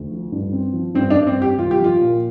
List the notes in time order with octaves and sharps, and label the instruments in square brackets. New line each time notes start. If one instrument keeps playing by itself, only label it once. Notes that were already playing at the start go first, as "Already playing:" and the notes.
Already playing: [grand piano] D2
F3
G2
C4
F3
[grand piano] G2 [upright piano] C4
[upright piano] D4
[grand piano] G2
[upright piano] C4
[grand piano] C4 [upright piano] G4
[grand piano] C2 [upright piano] F4
[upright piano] G4
[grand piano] F3 [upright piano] F4
[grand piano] A#2